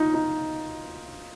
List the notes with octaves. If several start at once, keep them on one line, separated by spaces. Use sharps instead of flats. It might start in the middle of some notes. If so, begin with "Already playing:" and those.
Already playing: D#4 F4
D#4